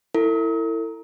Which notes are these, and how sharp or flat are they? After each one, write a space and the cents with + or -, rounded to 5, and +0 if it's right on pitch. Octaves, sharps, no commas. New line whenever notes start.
E4 +0 A4 +40